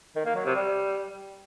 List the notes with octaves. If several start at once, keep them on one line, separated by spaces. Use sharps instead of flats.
D#3
A#3
F#3
C3
G3